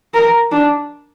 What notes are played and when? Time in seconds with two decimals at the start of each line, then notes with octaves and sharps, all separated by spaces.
0.14 A#4
0.51 D4